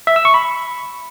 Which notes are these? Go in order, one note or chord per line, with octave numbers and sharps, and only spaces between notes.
E5
E6
C#6
B5